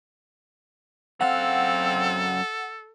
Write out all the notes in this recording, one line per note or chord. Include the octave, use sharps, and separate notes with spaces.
F#2 C4 A4 F5 F#5